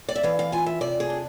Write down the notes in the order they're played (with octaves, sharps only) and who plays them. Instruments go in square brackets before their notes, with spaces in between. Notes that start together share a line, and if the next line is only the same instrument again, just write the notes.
[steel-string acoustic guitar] D5
E5
E3 F5
F5
F4 G#5
E5
C3 D5
G#4
D4